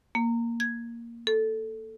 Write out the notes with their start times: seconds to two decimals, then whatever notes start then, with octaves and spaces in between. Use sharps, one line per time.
0.15 A#3
0.60 G#6
1.27 A4